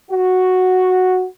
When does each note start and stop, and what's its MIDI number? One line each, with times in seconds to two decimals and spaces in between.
0.11 1.24 66